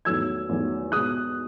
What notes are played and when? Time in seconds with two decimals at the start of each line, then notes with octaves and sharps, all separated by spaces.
0.05 E2 D#3 F#3 A3 E6 G#6
0.49 E2 D#3 F#3 A3
0.92 B2 G#3 D#6 F#6